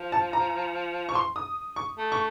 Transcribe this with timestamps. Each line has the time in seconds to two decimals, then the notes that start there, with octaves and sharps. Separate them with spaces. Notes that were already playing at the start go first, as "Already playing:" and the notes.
Already playing: F3
0.12 A5
0.33 A#5
1.09 C#6
1.15 C6
1.36 D#6
1.76 C#6
1.98 A3
2.12 C#6